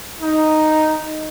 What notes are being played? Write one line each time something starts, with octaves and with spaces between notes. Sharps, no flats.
D#4